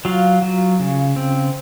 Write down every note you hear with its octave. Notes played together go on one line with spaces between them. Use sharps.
F#3 F4 F5
F#3
C#3
C4